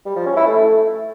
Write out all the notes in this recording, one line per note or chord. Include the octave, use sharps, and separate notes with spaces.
G3
F3
C#4
E4
A3